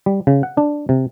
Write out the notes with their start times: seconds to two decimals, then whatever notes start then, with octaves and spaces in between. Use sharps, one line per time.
0.06 G3
0.27 C#3
0.43 F#5
0.57 D4
0.89 C3